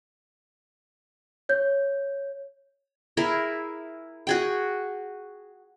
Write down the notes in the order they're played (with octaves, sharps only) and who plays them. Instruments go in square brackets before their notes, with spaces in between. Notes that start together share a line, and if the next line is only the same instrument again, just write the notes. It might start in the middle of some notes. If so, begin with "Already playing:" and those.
[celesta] C#5 G6
[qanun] E4 G#4 A#4
F#4 G#4 G5